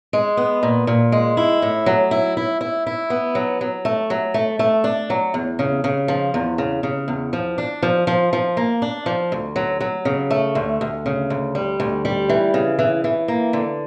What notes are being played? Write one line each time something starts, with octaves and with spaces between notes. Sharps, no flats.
G#3
B3
A#2
A#2
G#3
E4
A2
F#3
E4
E4
E4
E4
B3
F#3
F#3
A3
F#3
A3
A3
D4
F#3
E2
C#3
C#3
F3
E2
C#3
C#3
E2
F3
D4
F3
F3
F3
A#3
D4
F3
D2
F#3
F#3
C#3
A3
D2
D2
C#3
D2
G3
D2
G3
E3
C#3
E3
E3
A#3
D3